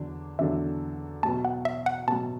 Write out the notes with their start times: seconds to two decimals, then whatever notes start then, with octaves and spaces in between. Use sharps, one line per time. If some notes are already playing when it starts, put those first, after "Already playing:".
Already playing: E2 D3 F#3 D4
0.39 E2 D3 F#3 D4 A4 E5
1.23 B2 F#3 A3 A5
1.45 F#5
1.65 E5
1.86 F#5
2.07 B2 F#3 A3 A5